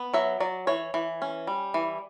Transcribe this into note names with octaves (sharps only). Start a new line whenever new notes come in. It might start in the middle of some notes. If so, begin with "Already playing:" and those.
Already playing: B3
F#3 E5
F#3 D5
E3 C#5
E3
C#4
G3
E3